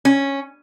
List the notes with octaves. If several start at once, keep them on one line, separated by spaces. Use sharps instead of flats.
C#4